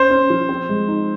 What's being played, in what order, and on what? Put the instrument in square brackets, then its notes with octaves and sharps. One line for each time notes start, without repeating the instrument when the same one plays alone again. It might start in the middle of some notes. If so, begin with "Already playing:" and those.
Already playing: [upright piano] C#4 [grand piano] C5
[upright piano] C#4
F3
C4
G#3
D#4